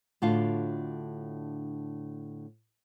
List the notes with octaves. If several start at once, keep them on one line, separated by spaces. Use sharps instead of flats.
A2 D3 D4 F4 F#4 F5